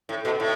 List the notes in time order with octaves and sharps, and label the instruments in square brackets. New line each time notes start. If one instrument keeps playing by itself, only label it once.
[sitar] A2
B2
A2